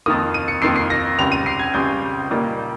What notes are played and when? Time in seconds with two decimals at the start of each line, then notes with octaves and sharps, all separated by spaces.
0.06 F2 D#3 A#3 D#6
0.34 D#7
0.48 C#7
0.62 F2 D#3 A#3 C7
0.76 C7
0.90 A#6
1.18 C#2 C#3 G3 C4 F7
1.32 D#7
1.46 C7
1.59 G#6
1.74 C#2 C#3 G3 C4 G6
2.31 A#2 G3 A#3 D#4